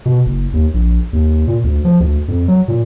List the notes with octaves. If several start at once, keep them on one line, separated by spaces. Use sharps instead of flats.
B2
F#1
D#2
A#1
D#2
A#2
D2
F3
D2
F2
F#3
A#2